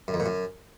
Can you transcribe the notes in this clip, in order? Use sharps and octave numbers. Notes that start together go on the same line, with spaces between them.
F#2
F2
A#2
F#2